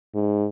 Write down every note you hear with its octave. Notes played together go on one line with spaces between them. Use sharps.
G#2